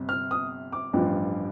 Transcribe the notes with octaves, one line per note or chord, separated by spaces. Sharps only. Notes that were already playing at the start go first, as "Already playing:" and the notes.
Already playing: G1 C3
F6
D#6
D6
A1 G2 F3